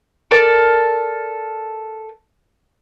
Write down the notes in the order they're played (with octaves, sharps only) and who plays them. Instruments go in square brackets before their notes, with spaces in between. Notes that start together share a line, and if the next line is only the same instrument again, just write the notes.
[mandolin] A4 A#4 D5